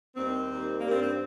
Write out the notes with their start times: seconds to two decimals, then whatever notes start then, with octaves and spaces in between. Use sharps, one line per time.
0.16 D#2 D#3 G3 C4
0.49 D#2 D#3 G3
0.81 G2 G3 A#3
0.91 C4
1.02 C4